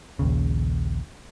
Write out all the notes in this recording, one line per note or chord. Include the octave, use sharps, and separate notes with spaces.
A#1 D#2 C#3